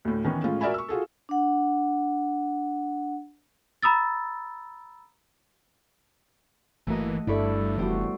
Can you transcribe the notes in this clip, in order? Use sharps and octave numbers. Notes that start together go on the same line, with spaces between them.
D2 A2
D#3 E3 B3 C#4
A2 G#3 C#4 F4
F#4 A#4 D5 E5 G#5 B5
C#6 E6
F4 F#4 G#4 A4
D4 F#5
A#5 B5 D#6 E6 A6
G1 E3 A3 A#3 F#4 D#5
G1 G2 D4 E4 A4 D5 B5 C#6
F1 G2 E3 G3 B3 F#4 G4 C5